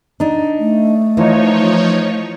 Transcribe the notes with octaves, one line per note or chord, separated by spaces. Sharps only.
D4 D#4
A3
E3 F3 D#4 C#5